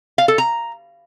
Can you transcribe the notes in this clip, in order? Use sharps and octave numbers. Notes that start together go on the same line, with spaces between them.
F5
A4
A#5